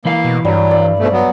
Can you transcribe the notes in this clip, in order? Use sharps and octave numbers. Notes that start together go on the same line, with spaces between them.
E3 A#3 E4 F5
B2
G2 F#3 G3
D5
G#2 B2 A3
F#3 B3